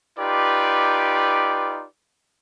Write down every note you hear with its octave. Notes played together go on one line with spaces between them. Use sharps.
D#4 F4 G4 B4 D5